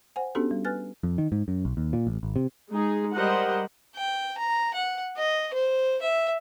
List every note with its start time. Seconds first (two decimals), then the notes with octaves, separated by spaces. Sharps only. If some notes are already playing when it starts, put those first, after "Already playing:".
0.16 C5 F#5 G#5
0.35 B3 C#4 D4 F#4 G4 A4
0.51 G3
0.65 B4 G#5 F6 F#6 A6
1.03 F2
1.18 D#3
1.32 G#2
1.48 F#2
1.65 B1
1.77 D#2
1.93 A#2
2.07 A1
2.23 G#1
2.36 C3
2.70 G#3 D#4 G#4
3.15 G3 G4 A#4 C5 D#5 F#5
3.95 G5
4.38 A#5
4.74 F#5
5.17 D#5
5.53 C5
6.02 E5